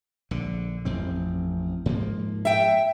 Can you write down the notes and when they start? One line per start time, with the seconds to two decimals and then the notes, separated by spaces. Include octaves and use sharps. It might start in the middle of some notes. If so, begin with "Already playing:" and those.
0.31 A#1 D3
0.85 A1 F2 C4
1.86 G#2 F3 A#3
2.45 E5 G5